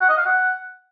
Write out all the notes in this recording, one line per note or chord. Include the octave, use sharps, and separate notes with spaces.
F#5
D#5
F5
F#5